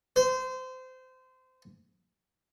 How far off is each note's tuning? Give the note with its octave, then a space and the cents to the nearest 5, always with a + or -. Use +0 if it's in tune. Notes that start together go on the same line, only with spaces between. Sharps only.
C5 -25